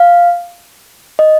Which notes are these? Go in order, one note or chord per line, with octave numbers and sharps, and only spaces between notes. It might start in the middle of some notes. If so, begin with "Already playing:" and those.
Already playing: F5
D#5